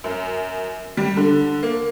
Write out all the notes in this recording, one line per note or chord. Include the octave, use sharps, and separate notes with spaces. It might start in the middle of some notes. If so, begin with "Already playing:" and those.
F#2
G3
D3
A#3